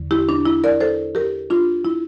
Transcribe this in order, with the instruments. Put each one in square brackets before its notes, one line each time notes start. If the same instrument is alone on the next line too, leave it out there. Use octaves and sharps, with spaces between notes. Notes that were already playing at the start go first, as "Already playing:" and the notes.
Already playing: [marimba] E2 D3
E4 G4
D4
E4
A#4 D5
A4 C5
G4 A#4
D4 F4
E4